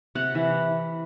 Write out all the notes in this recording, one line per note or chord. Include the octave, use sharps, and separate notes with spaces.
C3 F#5
E3